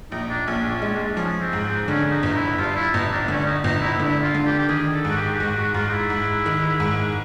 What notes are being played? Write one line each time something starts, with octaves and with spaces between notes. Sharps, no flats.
A#1 D#4
D4
A#1 C#4
D4
C#4
G#3
D4
F3 C#4
C4
G#2
C4
D3 C#4
D#4
G1
E4
G2 F4
E4
G1 D#4
D4
D3 C#4
D#4
G1 D#4
E4
D3 E4
F4
D3
G4
G4
D#3 G#4
A4
G#2
F#4
G4
G4
G#2 F#4
F#4
F#4
G#2 F4
D#4
E4
G#2
D#3
G#2